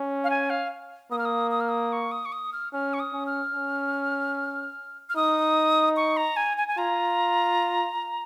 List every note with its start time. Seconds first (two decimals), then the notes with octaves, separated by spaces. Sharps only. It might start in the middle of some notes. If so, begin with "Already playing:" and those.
Already playing: C#4
0.24 F5
0.30 G#5
0.50 F5
1.11 A#3 D#6
1.18 F6
1.25 D#6
1.51 D#6
1.61 F6
1.69 D#6
1.92 C#6
2.12 D#6
2.25 C#6
2.32 D#6
2.53 F6
2.73 C#4 F6
2.94 C#6
3.00 D#6
3.13 C#4
3.27 F6
3.54 C#4
5.09 F6
5.16 D#4 D#6
5.97 C#6
6.17 A#5
6.36 G#5
6.57 G#5
6.68 G#5
6.77 F4 A#5